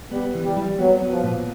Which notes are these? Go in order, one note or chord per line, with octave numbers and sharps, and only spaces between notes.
G3 B3
E3
G3
G3
F#3 B3
B3
F3
A#2